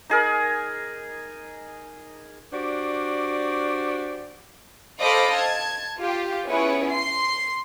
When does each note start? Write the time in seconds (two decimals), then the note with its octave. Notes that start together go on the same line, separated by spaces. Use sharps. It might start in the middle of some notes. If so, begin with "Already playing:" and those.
0.10 D#4 G#4 A#4
2.52 D4 F#4 G4 C5 D5
5.00 A4 C5 D#5 F5 B5 D6
5.35 A5 G#6
5.98 F4 G4
6.46 B3 C#4 E4 G#4 B4 C#5
6.91 C6 C7